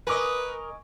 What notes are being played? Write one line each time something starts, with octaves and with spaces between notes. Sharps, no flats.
A#4 B4 D#5 G#5 C#6 D6